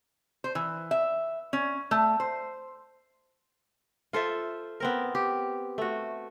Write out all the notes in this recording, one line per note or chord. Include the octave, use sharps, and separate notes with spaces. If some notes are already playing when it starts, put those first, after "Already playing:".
C5
E3
E5
C#4
A3
C5
F4 A4 C5 E5
B3 C4 A#4
G4
A3 F#4